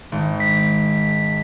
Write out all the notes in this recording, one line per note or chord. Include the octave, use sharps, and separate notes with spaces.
G#1
B6